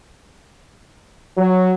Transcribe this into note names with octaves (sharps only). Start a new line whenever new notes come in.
F#3